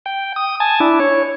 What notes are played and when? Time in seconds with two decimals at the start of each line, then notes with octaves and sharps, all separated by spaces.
0.06 G5
0.36 D#6
0.60 G#5 A5
0.80 D4 E4
1.00 C#5